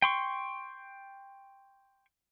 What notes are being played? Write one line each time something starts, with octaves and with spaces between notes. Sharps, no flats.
G5 C6 C#6